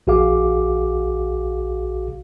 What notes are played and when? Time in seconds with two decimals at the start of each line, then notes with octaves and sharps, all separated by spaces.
0.07 A#1 F#4 G#4 F5 D6